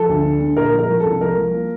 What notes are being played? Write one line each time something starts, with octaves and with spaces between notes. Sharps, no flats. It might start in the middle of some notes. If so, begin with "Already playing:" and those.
Already playing: F3 A4
D2
D3
D3
A#2 A#4
F3
A#4
F3
A4
C2
F3 A#4
F3
A#3